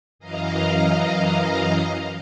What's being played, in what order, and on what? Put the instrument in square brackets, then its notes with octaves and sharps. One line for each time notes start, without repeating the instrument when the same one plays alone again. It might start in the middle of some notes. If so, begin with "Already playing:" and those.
[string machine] F#2 E3 D#5 F5 A#5